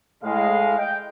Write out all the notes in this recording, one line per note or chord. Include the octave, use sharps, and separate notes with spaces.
A2 G#3 F5
D#5 G5